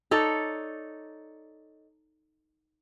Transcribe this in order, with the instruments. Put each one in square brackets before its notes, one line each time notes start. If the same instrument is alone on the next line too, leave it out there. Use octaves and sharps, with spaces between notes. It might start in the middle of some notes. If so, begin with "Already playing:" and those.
[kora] D#4 A4 C#5 D5